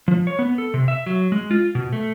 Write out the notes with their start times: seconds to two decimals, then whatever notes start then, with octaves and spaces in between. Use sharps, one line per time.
0.08 F3
0.27 C#5
0.39 B3
0.58 A4
0.74 C3
0.88 E5
1.06 F#3
1.32 G#3
1.51 F4
1.75 B2
1.93 A3